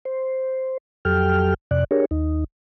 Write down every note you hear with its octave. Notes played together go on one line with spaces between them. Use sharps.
C5
F2 F#3 G4 A4 G5 F6
F2 C3 D5 F#6
D4 G4 G#4 A#4 C#5
D#2 D#4